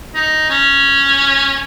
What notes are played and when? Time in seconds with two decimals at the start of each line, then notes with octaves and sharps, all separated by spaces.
0.15 D#4
0.50 C#4